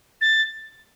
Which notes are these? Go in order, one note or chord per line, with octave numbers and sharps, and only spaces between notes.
A6